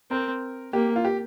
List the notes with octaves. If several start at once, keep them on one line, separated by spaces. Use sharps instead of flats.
C4 A#4
A#3 G4
F4
G4